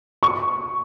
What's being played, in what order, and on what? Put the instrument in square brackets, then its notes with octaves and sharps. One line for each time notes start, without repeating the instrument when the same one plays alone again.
[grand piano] C#6